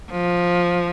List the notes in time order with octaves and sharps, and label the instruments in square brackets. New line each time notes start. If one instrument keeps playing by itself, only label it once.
[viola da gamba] F3